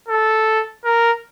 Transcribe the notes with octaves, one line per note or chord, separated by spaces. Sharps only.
A4
A#4